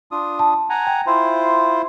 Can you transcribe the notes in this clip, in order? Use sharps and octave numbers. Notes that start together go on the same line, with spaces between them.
D4 F4 D#6
A5
F#5 G#5 A#5
G5
E4 F4 C5